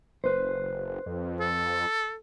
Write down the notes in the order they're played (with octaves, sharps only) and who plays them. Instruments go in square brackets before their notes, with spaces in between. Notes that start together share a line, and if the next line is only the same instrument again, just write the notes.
[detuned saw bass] F#1 [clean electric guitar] B4 C5
[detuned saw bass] F2
[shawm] A4